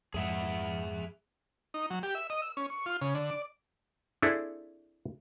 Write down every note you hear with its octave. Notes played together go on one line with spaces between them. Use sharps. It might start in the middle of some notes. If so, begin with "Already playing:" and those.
F2 G#2 G#4 E5 F#5
D#4
F#3
G4
E5
D#5
E6
C#4
C#6
F4
C#3
D3
D5
C4 D4 E4 G#4 A4